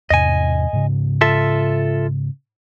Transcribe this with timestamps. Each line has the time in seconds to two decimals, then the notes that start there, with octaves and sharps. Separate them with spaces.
0.10 E2 G#2 C3 D#5 G#5
0.73 G#2 C#3
1.21 F4 A4 E5